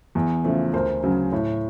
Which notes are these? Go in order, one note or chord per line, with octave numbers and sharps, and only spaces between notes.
E2
C#3 F3 A3
D2 A#4 C5
C#3 F#3
A2